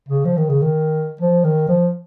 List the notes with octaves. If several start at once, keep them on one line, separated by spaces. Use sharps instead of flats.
C#3
F3
D#3
C#3
D#3
F3
D#3
F3